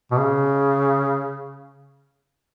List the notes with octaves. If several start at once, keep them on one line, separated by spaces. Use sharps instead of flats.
B2
C#3